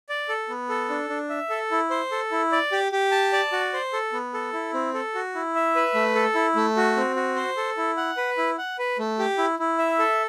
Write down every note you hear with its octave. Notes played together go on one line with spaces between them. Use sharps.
D5
A4
B3
A4
D4
D4
E5
A4
E4
C5
A4
E4
D5
G4
G4
A5
D5
F#4
C5
A4
B3
A4
E4
C4
A4
F#4
E4
E5
B4
A3
A4
E4
A3
F#4
C4
F#4
C5
A4
E4
F#5
B4
E4
F#5
B4
A3
G4
E4
E4
E5
A4